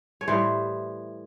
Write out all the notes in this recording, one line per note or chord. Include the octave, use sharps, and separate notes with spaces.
C#5
A2 E3 G3 C5